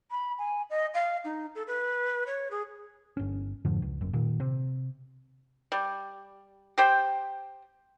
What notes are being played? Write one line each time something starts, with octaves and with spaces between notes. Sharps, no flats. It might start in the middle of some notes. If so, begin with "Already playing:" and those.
B5
G#5
D#5
F5
D#4
A4
B4
C#5
G#4
G1 C#4
F2 G#2 D3 F3
C#2
G1 F#2
A#2 D#3
C3
G3
G4 C5 G5